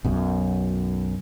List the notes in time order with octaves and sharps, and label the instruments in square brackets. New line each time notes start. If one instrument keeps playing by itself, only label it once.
[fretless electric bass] B1 F#2